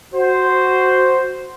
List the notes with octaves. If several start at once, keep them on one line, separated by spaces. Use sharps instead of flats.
F#4 C5